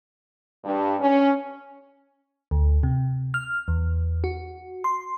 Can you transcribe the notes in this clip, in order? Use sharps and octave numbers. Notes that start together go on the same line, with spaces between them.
G2
C#4
D2
C3
F6
E2
F#4
C6